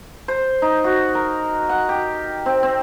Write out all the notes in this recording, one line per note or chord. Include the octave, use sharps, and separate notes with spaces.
C5
D#4
F#4
A#4
F#5
G4
C4
C4